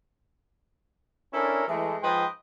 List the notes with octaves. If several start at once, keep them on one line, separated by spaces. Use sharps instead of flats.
C#4 D4 E4 A4 A#4
E3 G#3 A3
G#2 F3 B4 D#5 G5 C6